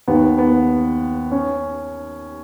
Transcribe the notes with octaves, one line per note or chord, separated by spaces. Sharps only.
D#2 D#3 B3
B3
C#4